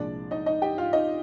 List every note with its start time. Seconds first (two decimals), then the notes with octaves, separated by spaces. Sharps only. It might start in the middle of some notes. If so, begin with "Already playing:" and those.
Already playing: C2 A#2 F3 G#3 D4 D5
0.31 D#4 D#5
0.46 D#4 D#5
0.62 G4 G5
0.78 F4 F5
0.93 D#4 D#5